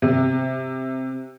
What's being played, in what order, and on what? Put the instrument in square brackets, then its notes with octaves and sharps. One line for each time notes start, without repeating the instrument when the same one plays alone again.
[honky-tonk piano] C3